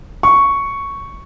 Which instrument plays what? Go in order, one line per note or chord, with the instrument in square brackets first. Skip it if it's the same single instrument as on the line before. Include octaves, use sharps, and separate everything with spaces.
[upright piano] C#6